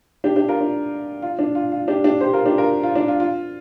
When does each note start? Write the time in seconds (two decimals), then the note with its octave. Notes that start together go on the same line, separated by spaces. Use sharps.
0.24 D4 G4
0.36 D4 G4
0.48 F4 A#4
0.61 D4
1.22 F4
1.39 D4
1.55 F4
1.72 F4
1.88 D4 G4
2.04 D4 G4
2.21 G4 C5
2.33 F4 A#4
2.46 D4 G4
2.58 F4 A#4
2.83 F4
2.95 D4
3.08 F4
3.20 F4